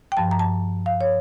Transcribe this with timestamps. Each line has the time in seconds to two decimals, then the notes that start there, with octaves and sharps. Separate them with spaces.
0.12 G5
0.17 G2 F3 A5
0.31 A#5
0.39 A5
0.86 F5
1.01 C#5